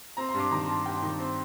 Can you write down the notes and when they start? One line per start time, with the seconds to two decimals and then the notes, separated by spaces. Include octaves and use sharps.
0.17 C4 A#5
0.29 C6
0.34 G2
0.40 D6
0.51 D#3 A#5
0.68 G2 A5
0.86 G2 G5
1.02 D#3
1.19 C4